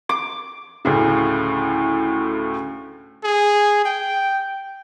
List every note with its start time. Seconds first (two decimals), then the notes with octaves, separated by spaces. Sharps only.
0.09 D6
0.85 D2 A2 C#3
3.24 G#4
3.85 G5